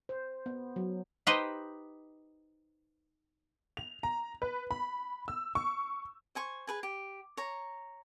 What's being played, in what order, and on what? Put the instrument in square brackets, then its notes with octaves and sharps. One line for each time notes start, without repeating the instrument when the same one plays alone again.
[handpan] C5
B3
F#3
[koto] D#4 G4 B4 C5 D#5
[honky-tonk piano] F7
A#5
B4
B5
E6
C#6
[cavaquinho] C5 G#5 C#6
G#4 B4 G#5
G4
C#5 A#5